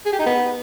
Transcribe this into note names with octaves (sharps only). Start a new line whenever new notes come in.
G#4
G4
D#4
B3